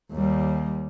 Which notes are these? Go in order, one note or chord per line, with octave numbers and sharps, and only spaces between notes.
D#2 G3